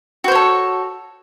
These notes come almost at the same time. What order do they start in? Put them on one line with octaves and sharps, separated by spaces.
F#4 C5 C#5 A4